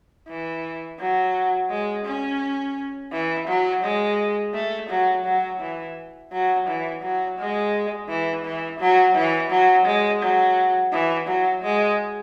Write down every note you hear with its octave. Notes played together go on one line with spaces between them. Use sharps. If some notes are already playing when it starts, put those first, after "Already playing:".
E3
F#3
G#3
C#4
E3
F#3
G#3
A3
F#3
F#3
E3
F#3
E3
F#3
G#3
E3
E3
F#3
E3
F#3
G#3
F#3
E3
F#3
G#3